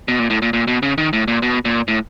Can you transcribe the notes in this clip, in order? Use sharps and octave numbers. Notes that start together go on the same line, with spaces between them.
B2
A#2
A2
A#2
A#2
B2
C#3
D#3
A2
A#2
B2
A#2
A2